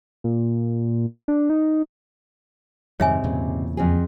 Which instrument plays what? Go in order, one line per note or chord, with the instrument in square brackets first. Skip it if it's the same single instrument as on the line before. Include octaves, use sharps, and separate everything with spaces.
[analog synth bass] A#2
D4
D#4
[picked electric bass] F2 D#3 G3 [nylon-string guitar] G#2 C3 [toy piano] C#5 E5 G#5
[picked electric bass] E2 A#2 C#3
[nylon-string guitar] F2 C4 G#4